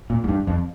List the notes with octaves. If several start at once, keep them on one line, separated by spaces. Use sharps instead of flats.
A#2
G#2
G2
F2